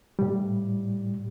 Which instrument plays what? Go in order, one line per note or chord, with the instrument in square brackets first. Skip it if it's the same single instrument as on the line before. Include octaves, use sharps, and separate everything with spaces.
[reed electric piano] A2 G3